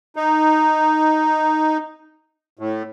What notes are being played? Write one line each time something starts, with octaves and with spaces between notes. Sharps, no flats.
D#4
A2